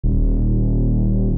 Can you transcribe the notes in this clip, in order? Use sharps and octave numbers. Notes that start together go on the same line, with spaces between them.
D#1